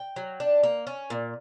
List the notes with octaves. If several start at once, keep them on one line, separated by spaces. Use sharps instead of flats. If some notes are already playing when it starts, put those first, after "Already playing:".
Already playing: G5
F#3
D4
A#3
C#4
A#2